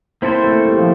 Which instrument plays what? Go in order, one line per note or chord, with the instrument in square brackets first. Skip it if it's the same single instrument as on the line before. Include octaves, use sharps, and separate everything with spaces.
[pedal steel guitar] A#3 E4 A4 C5 [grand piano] C4
[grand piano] A3
G3
F3